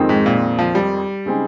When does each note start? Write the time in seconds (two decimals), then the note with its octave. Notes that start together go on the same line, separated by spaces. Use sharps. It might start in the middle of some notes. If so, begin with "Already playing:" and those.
Already playing: F2 D#3 G#3 C4 D#4
0.09 G#2
0.26 A#2
0.59 F3
0.75 G3
1.25 C#3 G#3 C4 D#4 G#4